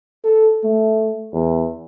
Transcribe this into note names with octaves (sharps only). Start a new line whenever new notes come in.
A4
A3
E2